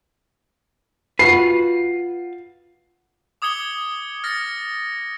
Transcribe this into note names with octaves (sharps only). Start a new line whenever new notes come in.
F4 F#4 B4 C7
D6 D#6 G#6 C#7 G7
F6 A6 A#6 C#7